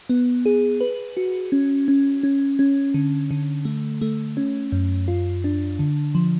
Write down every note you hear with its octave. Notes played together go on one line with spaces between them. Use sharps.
B3
G#4
B4
F#4
C#4
C#4
C#4
C#4
D3
D3
A3
A3
C#4
F#2
F4
D4
D3
F3